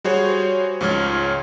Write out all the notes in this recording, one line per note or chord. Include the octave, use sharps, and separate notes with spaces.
G3 F#4 G#4 C5 C#5
C#2 G#2 F3 C#5 F6 G#6